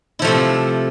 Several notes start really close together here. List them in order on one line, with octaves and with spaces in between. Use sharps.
E4 F3 A3 C3